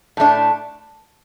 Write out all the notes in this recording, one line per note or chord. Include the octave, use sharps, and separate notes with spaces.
A2 A3 D4